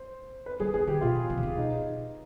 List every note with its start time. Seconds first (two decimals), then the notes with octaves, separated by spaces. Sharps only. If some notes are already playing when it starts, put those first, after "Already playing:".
Already playing: C5
0.46 B4
0.60 G3 G#4
0.74 B3 G#4
0.87 D3 G4
1.01 B2 F4
1.16 D3
1.30 D#3
1.38 C3
1.43 D3
1.57 B2 D#4